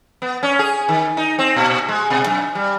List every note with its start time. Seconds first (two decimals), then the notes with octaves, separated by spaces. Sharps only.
0.22 B3
0.43 C#4
0.59 G#4
0.89 D#3
1.17 D#4
1.39 C4
1.56 A#2
1.88 G#3
2.10 B2
2.26 F#2
2.55 G3